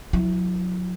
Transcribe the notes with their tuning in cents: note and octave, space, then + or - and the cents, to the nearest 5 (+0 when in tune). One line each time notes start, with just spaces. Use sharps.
F#3 -35 E4 +0